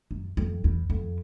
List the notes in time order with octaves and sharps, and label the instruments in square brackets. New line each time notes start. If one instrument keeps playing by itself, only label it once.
[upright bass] F#2
F2
E2
F2